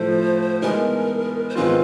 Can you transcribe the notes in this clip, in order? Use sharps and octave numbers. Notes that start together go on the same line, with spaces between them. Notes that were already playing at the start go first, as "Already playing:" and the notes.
Already playing: A2 F3 A3 C5
E3 G#3 B3 D#4 A#4
C5
G#2 D#3 G#3 C4 F4 B4